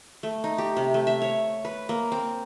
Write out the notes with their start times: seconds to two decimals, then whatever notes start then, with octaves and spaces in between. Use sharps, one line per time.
0.23 A3
0.44 D#4
0.58 G4
0.77 C3
0.94 A3
1.07 E5
1.22 C#5
1.65 B4
1.89 A#3
2.12 C4